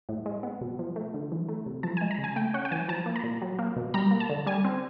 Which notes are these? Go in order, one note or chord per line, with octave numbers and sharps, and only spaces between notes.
A2
G#3
B3
B2
F3
A3
D3
E3
A3
C3
F3 A5
G#3 G#5
A#5
C#3
G#5
A3 G5
C#4 F#5
G5
E3 G#5
F3 A5
A#3
A#5
A#2
F#3
A#3
B2
G3 A#5
A#3
A5
D3
G3 G#5
C4